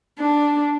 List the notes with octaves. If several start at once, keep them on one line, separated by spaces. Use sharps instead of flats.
D4